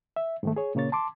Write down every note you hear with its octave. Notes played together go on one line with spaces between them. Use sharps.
E5
G#2 D#3 A3
G#4 C#5
A#2 C#3 A#3 C#5 A6
A5 C6 D6